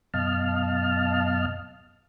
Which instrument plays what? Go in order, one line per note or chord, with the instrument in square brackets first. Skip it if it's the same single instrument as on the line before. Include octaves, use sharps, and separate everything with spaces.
[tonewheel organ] F#2 B2 D#5 F5 A5 F6